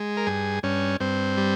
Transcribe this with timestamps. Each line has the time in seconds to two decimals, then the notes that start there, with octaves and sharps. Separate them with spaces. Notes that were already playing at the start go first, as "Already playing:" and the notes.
Already playing: G#3
0.17 A#4
0.26 G2 G#4
0.63 G2 C#4
1.00 G2 C4
1.37 G3